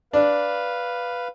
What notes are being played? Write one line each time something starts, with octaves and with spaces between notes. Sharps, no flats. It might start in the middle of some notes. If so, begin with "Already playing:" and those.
D4 B4 F5